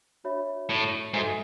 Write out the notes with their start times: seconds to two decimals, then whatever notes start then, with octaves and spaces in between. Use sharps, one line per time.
0.24 D4 F#4 C#5 E5 B5
0.69 A2
1.14 G#2 F#4 A4 E5 G#5